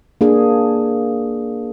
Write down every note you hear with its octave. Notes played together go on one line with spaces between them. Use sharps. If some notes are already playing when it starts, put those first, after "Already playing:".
A#3 D4 G#4